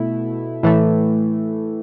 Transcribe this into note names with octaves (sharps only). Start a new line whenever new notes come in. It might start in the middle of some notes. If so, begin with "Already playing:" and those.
Already playing: B2 A3 E4
A2 E3 A3